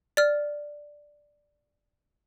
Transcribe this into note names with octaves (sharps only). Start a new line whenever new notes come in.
D5 F6